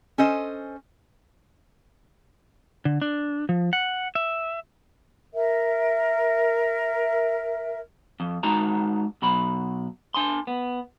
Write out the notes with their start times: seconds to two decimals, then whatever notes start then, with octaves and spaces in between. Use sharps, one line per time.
0.18 C#4 A4 C5 D#5
2.85 D3
3.02 D4
3.49 F3
3.73 F#5
4.15 E5
5.33 A#4 E5
8.20 F2
8.43 G#3 D#4 F#4 A#5
9.22 B2 F#3 B5
10.14 D4 G#5 C6
10.47 B3